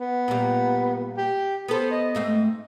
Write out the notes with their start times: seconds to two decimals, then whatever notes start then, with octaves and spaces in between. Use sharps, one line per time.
0.01 B3
0.28 A#2 G3
1.17 G4
1.68 B3 A4 C5
1.91 D#5
2.15 G#2 A3 C4